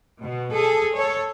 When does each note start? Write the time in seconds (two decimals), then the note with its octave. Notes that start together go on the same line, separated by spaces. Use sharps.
0.21 B2
0.52 G#4 A4
0.95 A4 C#5